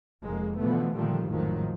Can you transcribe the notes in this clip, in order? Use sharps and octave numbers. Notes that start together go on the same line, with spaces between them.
F1 F2 G#3 A#3
B2 D3 E3 F3 A3 B3
A#2 D3 D#3 F3 G3 A3
G#1 F2 A2 D#3 F3 F#3